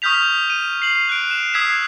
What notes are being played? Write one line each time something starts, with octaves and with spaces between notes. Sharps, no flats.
C#6 D#6 F6 G6 B6 F7
D#7
C7 F#7
F#6 D7
E7
D#6 E6 G#6 B6 C7 E7